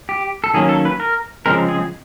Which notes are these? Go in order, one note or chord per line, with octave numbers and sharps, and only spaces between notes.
G4
A4
D#3 F#3 A#3 C#4 G#4
A4
B4
A#4
C#3 F3 G#3 C4 A#4
G#4